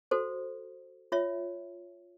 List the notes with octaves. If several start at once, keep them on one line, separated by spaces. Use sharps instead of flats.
F#4 A4 C5
F4 C#5 E5